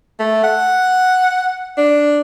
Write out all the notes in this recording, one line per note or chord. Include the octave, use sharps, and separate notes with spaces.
A3
F#5
D4